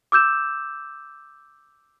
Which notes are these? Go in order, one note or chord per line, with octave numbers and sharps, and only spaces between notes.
D6 E6 G6 E7